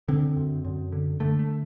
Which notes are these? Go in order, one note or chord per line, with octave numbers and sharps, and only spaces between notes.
D3 C4
F#2
F#2
D3
D3 A3
A3